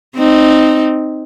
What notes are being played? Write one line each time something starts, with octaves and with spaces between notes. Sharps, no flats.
C4 D#4